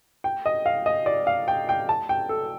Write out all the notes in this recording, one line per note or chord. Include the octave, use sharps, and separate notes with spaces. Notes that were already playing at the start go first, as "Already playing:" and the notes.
G5
D#5
F5
D#5
D5
F5
G5
G5
A5
G5
A4